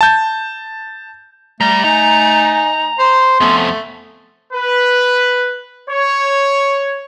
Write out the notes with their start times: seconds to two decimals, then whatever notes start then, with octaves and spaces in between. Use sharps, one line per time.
0.01 A5 G6
1.61 G3 A3 A#5
1.84 D#4 G#5 A#5
2.99 C5 C6
3.41 F2 A3 B3 C#4
4.52 B4
5.88 C#5